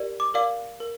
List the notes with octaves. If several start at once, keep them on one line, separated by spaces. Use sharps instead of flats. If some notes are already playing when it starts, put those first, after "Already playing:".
Already playing: G4 A#4 D5
D6
A#4 D5 F5 D6
A#4